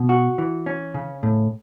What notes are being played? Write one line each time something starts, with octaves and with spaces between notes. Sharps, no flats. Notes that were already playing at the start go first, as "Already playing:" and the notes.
Already playing: B2
F#4
E3
C#4
C#3
A2